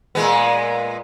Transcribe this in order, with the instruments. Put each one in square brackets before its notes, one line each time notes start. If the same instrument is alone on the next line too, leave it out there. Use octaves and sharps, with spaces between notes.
[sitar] A#2 G#3 B3